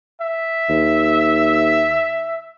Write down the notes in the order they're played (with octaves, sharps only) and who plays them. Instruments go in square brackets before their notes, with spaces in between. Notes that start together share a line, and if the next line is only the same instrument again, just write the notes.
[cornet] E5
[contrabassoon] D#2